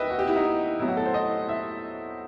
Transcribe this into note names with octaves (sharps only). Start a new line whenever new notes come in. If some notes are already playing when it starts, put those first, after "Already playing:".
Already playing: D#2 B4 D#5 E5 G5
F#4
G4
E4
D#4
A2 F#3 B3 E4
F#4
A4
C5
D#5
E5